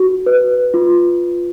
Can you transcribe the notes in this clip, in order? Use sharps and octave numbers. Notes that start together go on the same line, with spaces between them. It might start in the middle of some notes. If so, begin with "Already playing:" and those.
Already playing: F#4
B4
F4